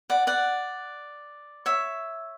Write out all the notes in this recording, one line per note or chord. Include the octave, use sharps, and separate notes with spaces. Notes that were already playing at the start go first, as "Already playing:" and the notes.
D5 F#5
D5 F#5
C#5 E5